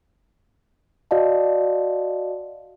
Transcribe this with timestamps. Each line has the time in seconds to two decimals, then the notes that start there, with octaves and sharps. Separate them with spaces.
1.11 F#4 D5 D#5 F5 A5